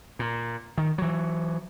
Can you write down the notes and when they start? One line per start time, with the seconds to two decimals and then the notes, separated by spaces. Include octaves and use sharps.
0.19 A#2
0.78 D#3
0.98 E3 F#3